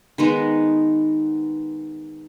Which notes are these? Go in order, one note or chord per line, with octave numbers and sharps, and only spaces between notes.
D#3 G#3 B3 D#4